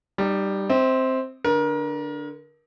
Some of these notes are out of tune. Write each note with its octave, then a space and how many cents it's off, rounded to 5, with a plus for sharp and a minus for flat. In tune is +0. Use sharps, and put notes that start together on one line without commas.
G3 +0 D#4 -30
C4 +0 E5 -40
D3 +0 A#4 +30